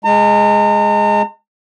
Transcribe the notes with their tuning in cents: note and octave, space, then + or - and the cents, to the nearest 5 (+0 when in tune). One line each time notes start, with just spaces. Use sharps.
G#3 +0 A#5 -40